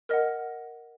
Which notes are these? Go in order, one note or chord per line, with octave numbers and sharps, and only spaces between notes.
A#4 D#5 F#5 F6